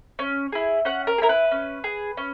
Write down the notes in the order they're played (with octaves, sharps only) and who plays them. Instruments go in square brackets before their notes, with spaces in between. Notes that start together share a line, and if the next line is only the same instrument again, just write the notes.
[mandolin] C#4
E4 G#4
C#4 F#5
A#4
G#4
E4 A#4
B4
C#4
G#4
C#4